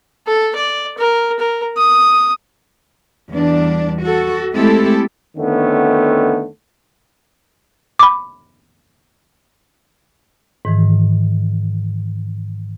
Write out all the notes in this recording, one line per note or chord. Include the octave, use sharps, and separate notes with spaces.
A4
D5
A#4
A#4
D#6
E2 G3 D4
F#4 A4
G#3 A3 C4 E4 G4 A4
F2 D3 D#3 A3 B3 C#4
B5 D6
G#2 D#3 E3